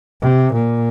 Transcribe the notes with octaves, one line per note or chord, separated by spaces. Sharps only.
C3
A#2